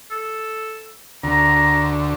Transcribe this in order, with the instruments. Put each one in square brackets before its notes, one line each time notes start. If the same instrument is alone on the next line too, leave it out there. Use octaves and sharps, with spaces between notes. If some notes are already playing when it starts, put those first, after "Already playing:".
[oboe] A4
[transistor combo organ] D2 [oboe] A#5